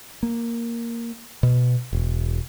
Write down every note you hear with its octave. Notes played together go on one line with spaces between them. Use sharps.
A#3
B2
E1